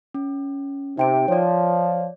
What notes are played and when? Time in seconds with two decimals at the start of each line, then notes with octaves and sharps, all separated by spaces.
0.14 C#4
0.97 C3 D#4 G5 D7
1.28 F3 C#5 D5